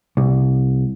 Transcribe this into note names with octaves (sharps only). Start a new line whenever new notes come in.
C2